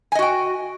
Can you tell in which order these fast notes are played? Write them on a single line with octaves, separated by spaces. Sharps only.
G#5 D#5 F#4 G5